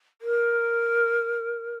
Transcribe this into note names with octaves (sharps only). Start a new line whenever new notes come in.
A#4